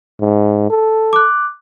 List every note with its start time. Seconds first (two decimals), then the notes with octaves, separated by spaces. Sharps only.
0.20 G#2
0.70 A4
1.13 D6 F#6